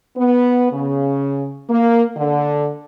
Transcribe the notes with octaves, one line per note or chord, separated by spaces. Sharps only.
B3
C#3
A#3
D3